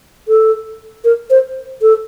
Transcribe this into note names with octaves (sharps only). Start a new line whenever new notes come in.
A4
A#4
C5
A4